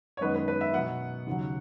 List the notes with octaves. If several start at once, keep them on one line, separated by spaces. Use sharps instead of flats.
C#5
F#2 D#3 G#3 B3 B4
B4
B4
E5
B2 F#3 B3 F#5
D#2 C#3 F#3